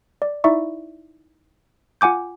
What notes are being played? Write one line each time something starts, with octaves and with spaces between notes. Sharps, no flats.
D5
D#4 E4 D5 E5 C#6
F4 F#5 G#5 D6 G6